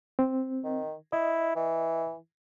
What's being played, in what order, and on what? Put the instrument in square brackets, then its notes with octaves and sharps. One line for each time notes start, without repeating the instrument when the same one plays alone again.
[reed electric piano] C4
[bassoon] D#3
[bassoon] E4 [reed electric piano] D#5
[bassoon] E3